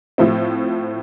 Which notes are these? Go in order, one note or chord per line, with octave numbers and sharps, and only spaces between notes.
A2 F3 A3 C4